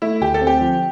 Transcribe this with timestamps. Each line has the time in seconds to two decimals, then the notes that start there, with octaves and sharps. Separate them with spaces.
0.02 A3 E4
0.21 D2 G4
0.34 A4
0.42 C4
0.47 G4
0.61 F3